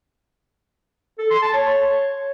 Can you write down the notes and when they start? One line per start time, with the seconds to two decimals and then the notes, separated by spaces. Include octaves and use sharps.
1.18 A4
1.30 C6
1.42 A5
1.54 C#5